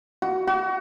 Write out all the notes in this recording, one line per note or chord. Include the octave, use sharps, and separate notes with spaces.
F#4
F#4